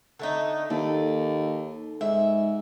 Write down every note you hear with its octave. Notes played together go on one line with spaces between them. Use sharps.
D3 A3 D#4
D#2 A4
G#2 E5